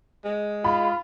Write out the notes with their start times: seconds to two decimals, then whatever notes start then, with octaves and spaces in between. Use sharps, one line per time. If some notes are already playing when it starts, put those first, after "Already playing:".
0.25 G#3
0.64 F4 B5